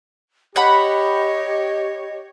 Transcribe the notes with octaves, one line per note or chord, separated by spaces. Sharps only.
G4 C#5 D#5 F#5 B5